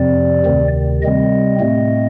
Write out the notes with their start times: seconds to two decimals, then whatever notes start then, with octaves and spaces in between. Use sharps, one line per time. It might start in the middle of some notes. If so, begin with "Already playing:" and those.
Already playing: F2 C3 F3 C4 D5
0.45 D2 C3 D#3
1.02 C3 G3 C4 D#5
1.60 A2 A3 C4